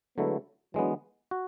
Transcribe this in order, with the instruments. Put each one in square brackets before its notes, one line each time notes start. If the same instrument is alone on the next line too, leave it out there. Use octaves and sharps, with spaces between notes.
[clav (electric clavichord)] D3 F#3 A3 E4 [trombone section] G#3 B3
[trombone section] D3 F#3 [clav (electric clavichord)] E3 G#3 B3
[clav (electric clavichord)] F#4